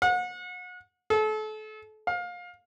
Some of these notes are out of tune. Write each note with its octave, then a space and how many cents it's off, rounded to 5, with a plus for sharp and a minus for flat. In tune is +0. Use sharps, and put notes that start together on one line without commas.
F#5 -35
A4 -35
F5 +25